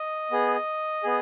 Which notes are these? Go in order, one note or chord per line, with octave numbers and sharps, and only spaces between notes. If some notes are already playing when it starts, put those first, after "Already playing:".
Already playing: D#5
B3 G#4
B3 G#4